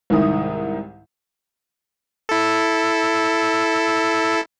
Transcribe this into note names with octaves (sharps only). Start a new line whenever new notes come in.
C2 G#2 D#3 E4 D#6
E4 A4